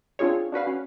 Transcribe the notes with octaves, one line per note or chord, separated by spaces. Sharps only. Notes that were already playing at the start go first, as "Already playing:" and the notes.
C4 D4 F4 G#4 C#5
D4 F#4 B4 F5
C#4